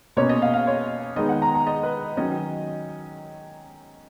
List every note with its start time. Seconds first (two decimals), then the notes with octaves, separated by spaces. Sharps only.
0.17 B2 A#3 C#4 C#5
0.29 D#5
0.42 F5
0.53 F5
0.67 C#5
1.16 D#3 G#3 B3 D#4 D#5
1.29 F#5
1.42 A#5
1.55 A#5
1.67 D#5
1.83 B4
2.17 D#3 F#3 C#4 D#5